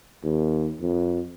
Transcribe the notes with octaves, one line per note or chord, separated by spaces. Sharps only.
D#2
F2